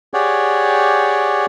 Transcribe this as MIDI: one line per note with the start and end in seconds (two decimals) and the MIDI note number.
0.14 1.46 67
0.14 1.46 68
0.14 1.46 73
0.14 1.46 74
0.14 1.46 78
0.14 1.46 79